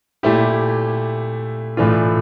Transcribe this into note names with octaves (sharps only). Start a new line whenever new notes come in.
A#2 A3 E4 G4
A2 E3 A3 D4 F4